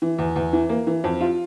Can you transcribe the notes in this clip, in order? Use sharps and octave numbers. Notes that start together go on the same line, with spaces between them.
E3
E2
E2
E3
A#3
E3
F2
F4